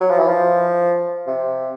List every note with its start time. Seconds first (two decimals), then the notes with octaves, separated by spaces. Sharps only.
0.01 F#3
0.10 F3
0.19 E3
0.28 F3
1.27 C3